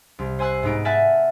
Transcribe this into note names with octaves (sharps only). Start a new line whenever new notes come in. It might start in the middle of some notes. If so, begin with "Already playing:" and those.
C2
C5 G#5 E6 F#6 C7
G#2 B3 D#4 D7
E5 F#5 G#5 A5 F6